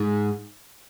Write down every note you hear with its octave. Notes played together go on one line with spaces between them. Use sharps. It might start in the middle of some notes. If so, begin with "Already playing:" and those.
Already playing: G#2